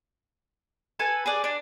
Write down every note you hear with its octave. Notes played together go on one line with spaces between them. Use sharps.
A4 B4 G#5
G#4 B4 D5
D4